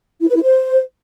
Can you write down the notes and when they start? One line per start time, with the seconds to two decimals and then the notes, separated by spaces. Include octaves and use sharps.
0.20 E4
0.27 B4
0.35 E4
0.42 C5